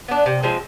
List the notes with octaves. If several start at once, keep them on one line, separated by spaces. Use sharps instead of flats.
B3 D4
C3
F3 G#3 C4